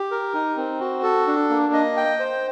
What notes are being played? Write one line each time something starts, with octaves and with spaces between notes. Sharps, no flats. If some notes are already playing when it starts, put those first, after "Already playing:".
Already playing: G4
A#4
D#4
C4
F#4
A4
D4
A#3
D#5
G5
C5